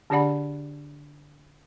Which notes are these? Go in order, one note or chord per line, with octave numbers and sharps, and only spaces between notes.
D3 D4 G4 D5 F#5 B5